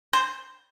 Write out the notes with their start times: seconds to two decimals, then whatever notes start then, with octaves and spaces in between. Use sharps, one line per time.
0.13 C5